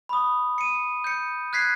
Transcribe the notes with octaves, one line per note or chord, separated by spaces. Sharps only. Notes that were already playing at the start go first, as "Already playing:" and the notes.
B5 D#6
C#7 D#7
G6 C#7
F#6 G#6 B6 C7